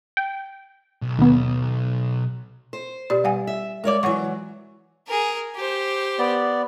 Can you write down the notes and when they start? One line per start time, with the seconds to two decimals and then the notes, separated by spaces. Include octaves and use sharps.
0.17 G5
1.02 B1
1.19 D#2 B3
2.73 C5
3.10 B2 G4 D5
3.24 G3 F#5 G#5
3.47 E5
3.84 G#3 A#4 C#5 D5 D6
4.03 E3 F#3 C#5 F#5 C#6
5.07 G#4 A#4
5.55 G4 C5
6.19 B3 D5